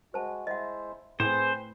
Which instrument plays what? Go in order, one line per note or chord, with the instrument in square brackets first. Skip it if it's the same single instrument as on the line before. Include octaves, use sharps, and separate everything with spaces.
[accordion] G#3 F#4 [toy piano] C5 A5
[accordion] G#3 E4 C5 [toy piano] D#5 E5 F#5
[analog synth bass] A2 [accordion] C4 G#4 B4 [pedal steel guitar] C5